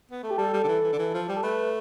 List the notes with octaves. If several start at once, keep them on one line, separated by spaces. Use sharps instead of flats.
B3
A3 A4
G4
G3 A4
G3
D3
E3
E3
D3
E3
F3
G3 G4
A4
A3 B4